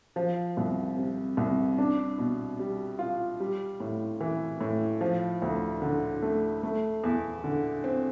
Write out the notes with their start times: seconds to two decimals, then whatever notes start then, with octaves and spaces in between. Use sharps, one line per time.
0.16 F3
0.57 C2
0.97 C3
1.37 C2
1.78 D4
2.18 B2
2.59 G3
2.99 F4
3.40 G3
3.80 A2
4.21 E3
4.61 A2
5.01 F3
5.42 D2
5.82 D3
6.22 A3
6.63 A3
7.03 E2
7.44 D3
7.84 C4